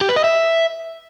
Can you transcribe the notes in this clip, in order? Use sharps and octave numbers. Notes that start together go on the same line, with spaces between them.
G4
B4
D#5
E5